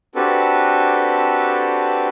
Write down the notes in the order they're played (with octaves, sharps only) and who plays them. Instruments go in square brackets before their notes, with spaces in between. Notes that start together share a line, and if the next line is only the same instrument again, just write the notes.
[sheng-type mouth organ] C4 D4 F#4 G4 A4 B4